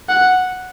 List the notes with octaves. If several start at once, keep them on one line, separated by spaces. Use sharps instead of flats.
F#5